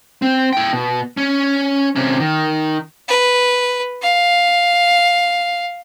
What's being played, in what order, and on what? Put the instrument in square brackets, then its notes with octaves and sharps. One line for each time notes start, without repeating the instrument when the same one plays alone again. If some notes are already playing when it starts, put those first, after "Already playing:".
[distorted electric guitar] C4
E4 G5
B2
C#4
C3 C#4
D#3
[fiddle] B4
F5